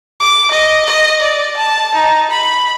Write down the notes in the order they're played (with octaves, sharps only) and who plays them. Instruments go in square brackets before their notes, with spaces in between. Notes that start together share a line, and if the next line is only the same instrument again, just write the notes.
[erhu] D6
D#5
D#5
D5
A5
D#4
B5